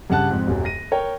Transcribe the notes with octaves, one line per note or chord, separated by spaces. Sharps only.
G2 C#3 F#5 A5 F#6
F2 G#2
D#1 F#2 F#3
A#6 D#7
A#4 C#5 G5